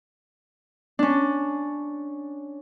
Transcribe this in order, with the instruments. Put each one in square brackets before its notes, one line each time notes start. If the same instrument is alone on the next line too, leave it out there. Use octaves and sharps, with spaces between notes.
[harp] C#4 D4